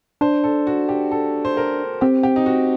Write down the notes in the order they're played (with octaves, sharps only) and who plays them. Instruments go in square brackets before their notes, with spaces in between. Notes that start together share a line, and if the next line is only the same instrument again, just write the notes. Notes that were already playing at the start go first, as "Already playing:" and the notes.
[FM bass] D4 [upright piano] C5
[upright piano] A4
F#4
G4
A4
C5
A#4
[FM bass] C4 [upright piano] G4
[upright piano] G4
D#4
F#4